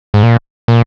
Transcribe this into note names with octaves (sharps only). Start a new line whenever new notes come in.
G#2
A#2
A#2